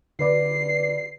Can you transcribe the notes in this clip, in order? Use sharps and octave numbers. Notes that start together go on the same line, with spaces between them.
D3 B4 D5 C7